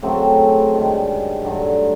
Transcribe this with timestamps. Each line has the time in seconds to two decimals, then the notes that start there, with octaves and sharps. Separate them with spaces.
0.02 C#3 F#3 A3 C4
0.73 G2 D#3 G#3 C#4
1.44 G2 D3 F#3 A3